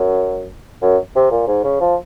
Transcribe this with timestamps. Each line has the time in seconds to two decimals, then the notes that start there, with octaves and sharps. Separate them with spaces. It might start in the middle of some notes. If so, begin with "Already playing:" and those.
Already playing: F#2
0.82 F#2
1.16 C3
1.31 A#2
1.47 G#2
1.64 C#3
1.81 F3